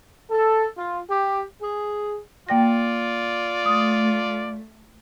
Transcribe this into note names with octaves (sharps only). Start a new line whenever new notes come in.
A4
F4
G4
G#4
A#3 F4 D5 G5 A#6
A3 D#6